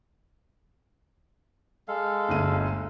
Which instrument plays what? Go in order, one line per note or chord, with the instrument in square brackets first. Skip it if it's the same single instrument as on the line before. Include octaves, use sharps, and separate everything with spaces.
[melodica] G#3 A4 F5
[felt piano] G1 D2 D#7